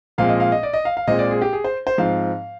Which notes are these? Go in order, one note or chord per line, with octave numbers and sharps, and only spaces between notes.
A#2 F3 G#3 C4 F5
D#5
F5
D#5
D5
D#5
F5
F5
A#2 G#3 C4 D#5
D5
G#4
G4
G#4
C5
C5
G#2 F3 C4 F5